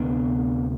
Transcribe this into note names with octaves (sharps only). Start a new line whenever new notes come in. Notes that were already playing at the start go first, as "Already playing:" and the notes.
Already playing: D2 C3 B3 D4